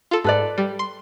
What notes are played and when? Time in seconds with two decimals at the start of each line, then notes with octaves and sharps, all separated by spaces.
0.11 F4 A4
0.24 G#2 A4 B4 D5
0.58 G3
0.79 C6